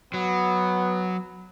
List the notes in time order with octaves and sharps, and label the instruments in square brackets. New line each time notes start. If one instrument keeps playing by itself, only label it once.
[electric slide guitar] F#3 [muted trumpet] B3